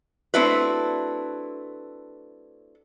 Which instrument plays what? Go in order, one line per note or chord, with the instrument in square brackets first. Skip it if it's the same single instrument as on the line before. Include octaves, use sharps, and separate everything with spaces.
[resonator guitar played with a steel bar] A3 C4 D4 E4 F#4 B4